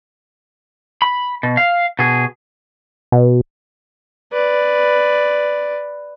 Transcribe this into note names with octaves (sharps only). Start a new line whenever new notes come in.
B5
B2
F5
B2 G#4
B2
B4 D5